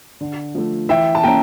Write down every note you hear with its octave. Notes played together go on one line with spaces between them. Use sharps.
D3
F3 A3
E3 E5 G5
A5
A#3 C#4 G5 A#5